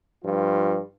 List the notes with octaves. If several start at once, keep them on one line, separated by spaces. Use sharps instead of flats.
G2 F3 F4